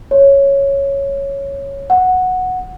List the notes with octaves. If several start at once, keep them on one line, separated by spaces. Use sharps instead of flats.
C#5
F#5